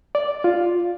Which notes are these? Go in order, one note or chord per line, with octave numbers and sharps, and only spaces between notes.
D5
F4